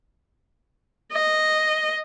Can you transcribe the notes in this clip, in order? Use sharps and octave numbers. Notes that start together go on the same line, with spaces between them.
D#5